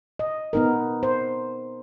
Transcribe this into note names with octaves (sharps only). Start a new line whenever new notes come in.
D#5
B3 D#4 A#4
C5